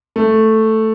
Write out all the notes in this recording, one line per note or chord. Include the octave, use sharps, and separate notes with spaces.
A3